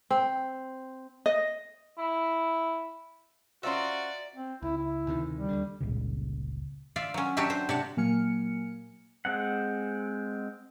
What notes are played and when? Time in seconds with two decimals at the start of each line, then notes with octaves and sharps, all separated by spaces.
0.10 C4
1.26 D#5
1.98 E4
3.63 C#4 F4 F#4 C5 D5 E5 A#5 C6
4.35 C4
4.62 C#2 E4
4.78 E4
5.07 D2 C3 D#3
5.34 G3
5.49 D#2 D3
5.81 G1 C#2 A#2 C#3
6.96 F4 D5 E5 F5
7.14 F#3 C#4
7.37 F#3 D4 F#4 G4 E5
7.50 C5
7.69 C3 D4 F#5
7.97 A#2 F#3 A#3 G#5 F6 C#7
9.25 G#3 C4 F#5